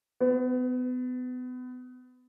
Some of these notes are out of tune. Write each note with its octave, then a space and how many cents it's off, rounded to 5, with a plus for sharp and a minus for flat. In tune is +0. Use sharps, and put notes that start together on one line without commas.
B3 +30